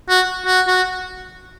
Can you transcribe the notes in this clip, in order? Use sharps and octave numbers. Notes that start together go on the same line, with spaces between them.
F#4
F#4
F#4